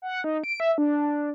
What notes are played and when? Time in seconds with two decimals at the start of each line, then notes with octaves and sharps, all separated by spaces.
0.02 F#5
0.24 D#4
0.44 D7
0.60 E5
0.78 D4